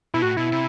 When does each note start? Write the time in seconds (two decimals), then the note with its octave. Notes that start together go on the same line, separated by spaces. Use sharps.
0.14 B2 E4
0.22 A2 F#4
0.37 B2 E4
0.52 C3